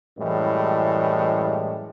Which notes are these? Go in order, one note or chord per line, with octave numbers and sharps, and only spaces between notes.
F#2 A2 E3 G3 G#3